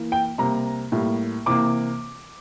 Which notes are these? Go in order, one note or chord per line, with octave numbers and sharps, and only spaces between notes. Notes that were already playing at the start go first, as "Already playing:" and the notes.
Already playing: E3 A#3
G5
C3 G3 A#3 A#5
A2 G3 A#3
C3 E3 A#3 D6